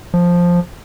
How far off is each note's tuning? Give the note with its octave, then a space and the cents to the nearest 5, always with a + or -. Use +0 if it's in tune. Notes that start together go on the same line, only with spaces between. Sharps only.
F3 +5